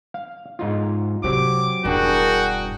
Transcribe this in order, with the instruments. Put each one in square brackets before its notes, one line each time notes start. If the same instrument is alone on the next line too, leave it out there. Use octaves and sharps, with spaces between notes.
[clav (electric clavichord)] F5
G#2 D#4 F4
[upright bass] C3 [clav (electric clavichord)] F#3 C4 G4 [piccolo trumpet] D6
[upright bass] E1 G2 [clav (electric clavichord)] D4 D5 [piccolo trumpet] F#4 [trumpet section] G#4 A#4 G5